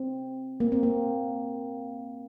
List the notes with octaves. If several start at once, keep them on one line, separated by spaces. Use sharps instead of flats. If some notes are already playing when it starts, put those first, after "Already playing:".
Already playing: C4
A#3
C4
A#3